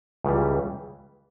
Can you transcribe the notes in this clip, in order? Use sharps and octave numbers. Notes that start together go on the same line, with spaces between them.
C#2 C#3 E3 G3